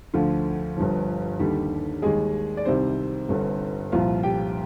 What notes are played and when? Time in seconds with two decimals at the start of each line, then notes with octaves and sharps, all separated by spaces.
0.14 D2 D3 F3 F4
0.77 G1 G2 F3
1.39 D#2 D3 G3 G4
2.02 D#2 D#3 G3 G#3 G#4
2.57 D5
2.65 C2 C3 D#3 G3 C4 C5
3.29 G1 G2 D3
3.92 C2 A#2 F3 F4 F5
4.23 G4 G5